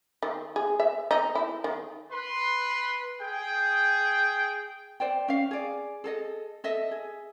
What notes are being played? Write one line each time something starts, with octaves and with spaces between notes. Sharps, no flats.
D#3
G#4
E5
D#4
E4
D#3
B4 C6
G#4 G5
C5 D5 G5
C#4 F5
G#4 D5
G#4 A4 D#5
A4 D#5 E5
G#4